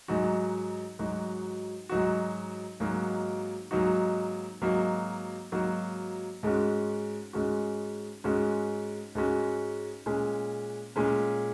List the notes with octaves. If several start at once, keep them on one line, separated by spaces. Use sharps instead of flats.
G#2 F#3 D#4 F#4
G#2 F#3 D#4 F#4
G#2 F#3 D#4 F#4
G#2 F#3 A#3 D#4 F#4
G#2 F#3 A#3 D#4 F#4
G#2 F#3 A#3 D#4 F#4
G#2 F#3 A#3 D#4 F#4
G#2 G#3 C#4 F#4
G#2 G#3 C#4 F#4
G#2 G#3 C#4 F#4
G#2 G#3 C#4 F#4
A#2 G#3 C#4
A#2 G#3 C#4